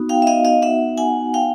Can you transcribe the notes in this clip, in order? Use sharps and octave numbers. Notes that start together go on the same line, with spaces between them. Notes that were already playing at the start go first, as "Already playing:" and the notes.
Already playing: B3 D#4 F#4
F5 G5
E5
D#5 F5
D#5 F5
E5 F#5
F#5 G#5
F5 G5